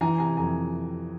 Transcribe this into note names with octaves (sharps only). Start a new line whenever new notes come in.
E3 G#5 A#5
C3 G#5 A#5
F2 G#5 A#5